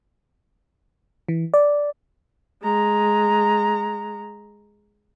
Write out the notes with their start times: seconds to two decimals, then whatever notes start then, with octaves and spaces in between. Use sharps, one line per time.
1.29 E3
1.54 D5
2.63 G#3 A#5